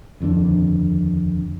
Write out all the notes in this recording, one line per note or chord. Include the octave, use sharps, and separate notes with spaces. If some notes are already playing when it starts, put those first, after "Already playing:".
D#1 F2 D3 D4